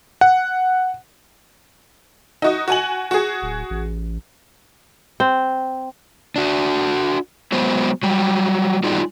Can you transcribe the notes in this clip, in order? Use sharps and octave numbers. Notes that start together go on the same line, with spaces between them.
F#5
D#4 F#4 D#5
F#4 G#5 F#7
F#4 G#4
D1
A1
C4
D4 F#4
F#3 G#3 B3 C5
F#3 G3
G3 D#4 F4 F#4 G#4 D5